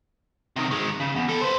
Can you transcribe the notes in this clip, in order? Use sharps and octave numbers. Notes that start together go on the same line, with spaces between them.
C3 D#3
D#3 G#3
C#3
E2
E3 A4
B4 C5